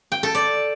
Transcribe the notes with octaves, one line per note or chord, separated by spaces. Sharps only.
G5
A4
D5